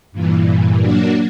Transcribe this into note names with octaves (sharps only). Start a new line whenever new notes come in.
G2 A#2 E3
F#3 A#3 D4 F#4